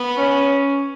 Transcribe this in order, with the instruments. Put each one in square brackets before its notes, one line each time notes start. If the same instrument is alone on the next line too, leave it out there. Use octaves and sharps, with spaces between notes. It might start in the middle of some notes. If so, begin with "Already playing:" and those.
Already playing: [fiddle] B3
[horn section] C#4